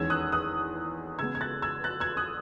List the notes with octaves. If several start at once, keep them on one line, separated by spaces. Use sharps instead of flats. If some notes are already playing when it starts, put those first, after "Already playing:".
Already playing: E2 D#3 G#3 C#4 E6 G#6
D#6 F#6
D#6 F#6
C#3 G#3 B3 E6 G#6
G#6
F#6 A6
E6 G#6
F#6 A6
E6 G#6
D#6 F#6